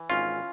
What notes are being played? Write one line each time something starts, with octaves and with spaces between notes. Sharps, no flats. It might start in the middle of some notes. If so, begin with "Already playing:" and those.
Already playing: E3
G#1 C#4 F4